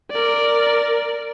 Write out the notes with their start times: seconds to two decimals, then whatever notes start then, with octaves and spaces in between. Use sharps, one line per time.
0.11 A#4 D5